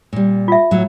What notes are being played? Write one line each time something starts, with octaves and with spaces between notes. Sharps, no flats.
A#2 G3
F4 E5
A2 F#3 A3